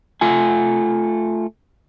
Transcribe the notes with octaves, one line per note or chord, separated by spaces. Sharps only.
A3 F4 G#5